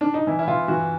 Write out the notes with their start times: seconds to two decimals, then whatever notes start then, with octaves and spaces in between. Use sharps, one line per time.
0.01 D4
0.14 D#4
0.27 E3 E4
0.39 E4
0.47 E3 F4
0.68 E3 F#4